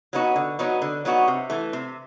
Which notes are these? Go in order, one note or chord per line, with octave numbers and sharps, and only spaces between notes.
F#3 B3 D#4 F#4
D3
F#3 B3 D#4 F#4
D3
F#3 B3 D#4 F#4
C3
E3 A3
C3